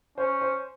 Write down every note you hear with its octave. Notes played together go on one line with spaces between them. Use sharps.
C#4 C5
C5